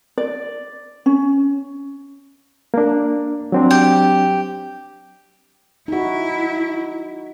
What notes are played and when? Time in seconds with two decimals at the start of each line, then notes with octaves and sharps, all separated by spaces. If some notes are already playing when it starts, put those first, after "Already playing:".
0.18 D5
1.06 C#4
2.74 A#3 D4
3.52 F#3 C4 D4
3.71 G4
5.88 D#4 E4 F#4